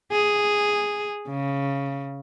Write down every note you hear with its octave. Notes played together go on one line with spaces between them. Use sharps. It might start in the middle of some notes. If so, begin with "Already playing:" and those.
G#4
C#3